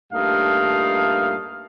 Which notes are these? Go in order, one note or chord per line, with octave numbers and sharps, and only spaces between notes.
G2 A#2 A3 D#4 F5